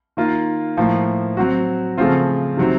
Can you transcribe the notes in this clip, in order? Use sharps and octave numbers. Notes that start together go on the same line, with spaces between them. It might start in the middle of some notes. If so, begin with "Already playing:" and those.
D#3 A#3 F4
A2 F3 A#3
F#3 C4 F#4
C#3 F3 A3 C4 F4
C3 D#3 F#3 C4